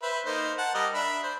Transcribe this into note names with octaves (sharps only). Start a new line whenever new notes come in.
B4 C5 E5
A#3 D#4 C5
F#5 A5
G3 A#4 D#5
D4 E5 B5
C5